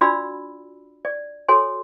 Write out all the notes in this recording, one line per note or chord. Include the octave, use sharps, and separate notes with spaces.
D4 F4 F#4 D5 B5 E6
D5
F#4 A4 C#5 G#5 C6